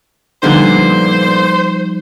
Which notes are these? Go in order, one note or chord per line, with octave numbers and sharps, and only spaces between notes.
A#2 D3 F3 G3 B3 D#4 C5